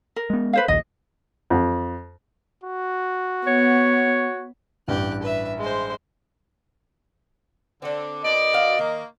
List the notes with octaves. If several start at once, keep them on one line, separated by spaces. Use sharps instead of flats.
A#4
G#3 B3
B4 C5 F5
A#1 D#2 D#5
F2
F#4
B3 C#5
A1 G2 G4 F#6
B4 E5
G#3 C5
D3 C4 D4
B2 D#3 D5 D#5
F#4 F5
D#3 A#3